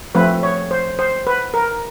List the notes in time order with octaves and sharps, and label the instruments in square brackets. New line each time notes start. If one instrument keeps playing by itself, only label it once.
[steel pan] F3 A3 C4 B4
C#5
C5
C5
B4
A#4